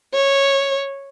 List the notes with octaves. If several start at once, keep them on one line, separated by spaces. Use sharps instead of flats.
C#5